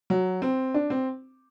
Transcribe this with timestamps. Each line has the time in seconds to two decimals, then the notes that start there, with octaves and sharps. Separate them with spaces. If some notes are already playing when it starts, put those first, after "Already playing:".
0.10 F#3
0.42 C4
0.74 D4
0.90 C4